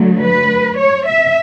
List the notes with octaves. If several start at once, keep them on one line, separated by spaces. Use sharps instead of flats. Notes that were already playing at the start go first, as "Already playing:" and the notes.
Already playing: D3 F#3 A3
B4
C#5
E5